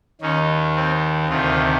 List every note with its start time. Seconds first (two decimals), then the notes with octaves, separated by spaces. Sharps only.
0.21 D#2 D#3 C#4
0.76 C4
1.29 D2 C3 D#3 F4